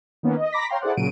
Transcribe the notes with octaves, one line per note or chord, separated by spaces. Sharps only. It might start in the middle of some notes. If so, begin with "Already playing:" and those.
D#3 A#3 B3 C#4
D#5
A#5 B5 D6 A#6 B6
C#5 F5 G5 A#5 C6
E4 G#4 A4 C5 D5 F#5
A#2 C#3 F#3 D7 D#7